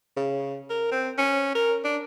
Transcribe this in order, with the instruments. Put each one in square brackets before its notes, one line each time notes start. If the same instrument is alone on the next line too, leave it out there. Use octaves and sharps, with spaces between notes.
[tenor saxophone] C#3
A#4
C4
C#4
A#4
D4